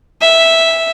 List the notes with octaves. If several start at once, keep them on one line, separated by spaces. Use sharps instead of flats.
E5